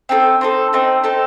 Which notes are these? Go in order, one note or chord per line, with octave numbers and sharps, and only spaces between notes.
C4 D#4 A4
C4 D#4 A4
C4 D#4 A4
C4 D#4 A4